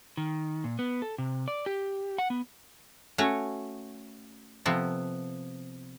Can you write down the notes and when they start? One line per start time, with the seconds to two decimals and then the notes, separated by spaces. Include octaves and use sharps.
0.17 D#3
0.64 A#2
0.79 B3
1.02 A4
1.18 C3
1.48 D5
1.66 G4
2.18 F#5
2.30 B3
3.18 A3 C#4 F#4 C#5
4.65 C3 F3 B3 A4